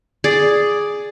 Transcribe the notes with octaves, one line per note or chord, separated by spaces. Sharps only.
G#4 D5